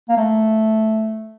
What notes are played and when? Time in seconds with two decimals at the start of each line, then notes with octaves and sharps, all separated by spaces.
0.09 A#3
0.17 A3